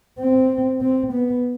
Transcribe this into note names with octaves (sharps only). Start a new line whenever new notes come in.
C4
C4
B3